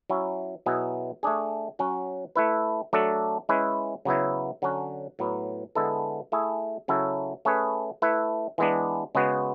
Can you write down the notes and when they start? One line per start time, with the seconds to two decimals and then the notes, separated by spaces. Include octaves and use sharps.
0.10 F#3 C#4 E4
0.66 B2 F#3 B3 E4 G#4
1.23 A3 D4 G#4
1.79 F#3 C#4 F#4
2.36 A3 E4 B4
2.93 F#3 A3 D4 A4
3.49 G#3 C#4 E4 B4
4.05 C#3 F#3 B3 E4
4.62 D3 F#3 C#4 F#4
5.19 A2 F#3 B3
5.75 D3 G#3 B3 E4 A4
6.32 A3 E4 G#4
6.88 C#3 F#3 C#4 E4 A4
7.45 A3 C#4 G#4 B4
8.02 A3 E4 B4
8.58 E3 G#3 B3 D4
9.15 C#3 G#3 B3 F#4